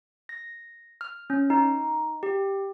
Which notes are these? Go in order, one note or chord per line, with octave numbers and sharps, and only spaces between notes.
A#6
F6
C#4
D#4
G4